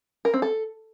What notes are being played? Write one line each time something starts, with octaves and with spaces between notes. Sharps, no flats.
A#4
C4
A4